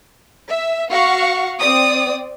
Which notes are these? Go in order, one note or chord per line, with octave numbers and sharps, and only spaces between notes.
E5
F#4 F5 F#5 C#6
C4 D5 D#6